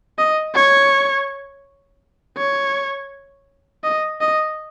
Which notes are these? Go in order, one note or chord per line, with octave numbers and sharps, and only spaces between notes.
D#5
C#5
C#5
D#5
D#5